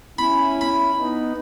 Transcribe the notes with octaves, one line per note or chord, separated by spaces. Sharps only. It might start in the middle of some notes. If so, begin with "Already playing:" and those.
C#4 E4 B5
B5
B3 D#4